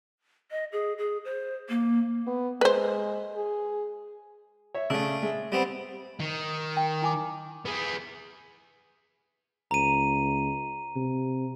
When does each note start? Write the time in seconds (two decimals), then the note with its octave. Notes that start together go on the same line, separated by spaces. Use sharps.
0.51 D#5
0.72 G#4
0.98 G#4
1.25 C5
1.69 A#3
2.27 B3
2.61 G#3 B4 C5
3.36 G#4
4.74 C#5 E5
4.90 C#3 A3 D4
5.23 G#3 E5
5.52 G3 B3 C4
6.20 D#3
6.77 G5
7.02 E4 G#5 D6
7.65 B3 G#4 B4 B5
9.71 C#2 A#5 D#7
10.96 C3